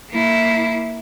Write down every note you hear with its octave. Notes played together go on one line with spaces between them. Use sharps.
A#3 E4